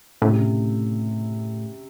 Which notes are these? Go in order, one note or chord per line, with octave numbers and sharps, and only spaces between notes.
A2 C#3
C3
C#3